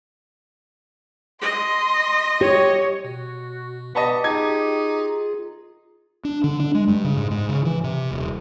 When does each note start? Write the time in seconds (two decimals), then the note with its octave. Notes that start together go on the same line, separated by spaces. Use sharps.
1.41 D#5 C6
2.41 G4 C#5
3.05 B2 F#4
3.95 B3 G4 D#5 A5 B5
4.24 D#4 F4 G#4 G#6
6.25 D4
6.44 D3
6.60 D4
6.75 G#3
6.87 G2
7.04 C#3
7.17 G#2
7.31 G#2
7.49 C#3
7.65 E3
7.84 C3
8.11 D#1